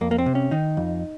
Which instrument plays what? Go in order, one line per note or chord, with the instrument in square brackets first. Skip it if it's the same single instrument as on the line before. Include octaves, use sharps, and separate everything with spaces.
[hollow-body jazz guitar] F2 A#3
A#3
C4
C3
C#4
D#3 D#4
F2